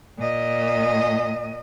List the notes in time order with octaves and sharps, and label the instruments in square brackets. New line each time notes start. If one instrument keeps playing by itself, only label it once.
[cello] A#2 D#5